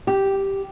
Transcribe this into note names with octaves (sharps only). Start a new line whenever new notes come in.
G4